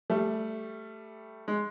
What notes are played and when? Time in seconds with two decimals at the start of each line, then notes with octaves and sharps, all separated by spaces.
0.10 G3 A3
1.48 G#3